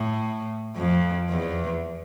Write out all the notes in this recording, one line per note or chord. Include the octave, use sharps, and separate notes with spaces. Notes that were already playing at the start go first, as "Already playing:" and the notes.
Already playing: A2
F2
E2